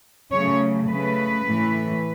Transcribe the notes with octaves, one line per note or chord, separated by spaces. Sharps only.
C#3 F#3 A3 C#5
C#3 A3 B4
A2 E3 A3